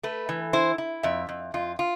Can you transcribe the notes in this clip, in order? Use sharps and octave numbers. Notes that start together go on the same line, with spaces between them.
A3 B4
E3
E4 C5
E4
F2 E5
F2
F2 F4
F4